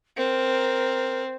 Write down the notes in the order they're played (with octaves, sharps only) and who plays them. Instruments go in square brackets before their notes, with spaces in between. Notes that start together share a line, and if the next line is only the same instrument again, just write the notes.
[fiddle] C4 [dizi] A#4